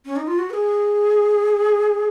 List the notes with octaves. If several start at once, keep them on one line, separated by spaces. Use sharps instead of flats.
C#4
D#4
F4
F#4
B4
G#4